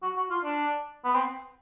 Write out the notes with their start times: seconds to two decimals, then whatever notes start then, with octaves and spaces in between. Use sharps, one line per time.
0.02 F#4
0.16 F#4
0.30 F4
0.44 D4
1.04 B3
1.15 C4